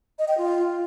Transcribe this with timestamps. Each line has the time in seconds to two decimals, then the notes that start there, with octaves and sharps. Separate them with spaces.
0.19 D#5
0.28 G5
0.38 F4